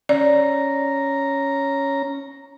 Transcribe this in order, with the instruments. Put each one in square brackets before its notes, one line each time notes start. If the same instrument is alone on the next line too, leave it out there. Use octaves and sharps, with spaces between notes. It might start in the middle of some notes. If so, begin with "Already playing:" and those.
[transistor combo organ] C#4 A#5 [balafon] D5